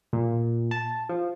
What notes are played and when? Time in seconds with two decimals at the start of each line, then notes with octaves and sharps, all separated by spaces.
0.13 A#2
0.71 A5
1.09 F3